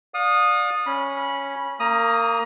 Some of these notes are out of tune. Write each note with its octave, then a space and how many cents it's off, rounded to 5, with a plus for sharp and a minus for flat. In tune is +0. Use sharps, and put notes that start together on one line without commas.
D5 +0 F5 +40 D#6 -10
C#4 +0 B5 -15
A#3 -20 A#5 +20 D#6 +0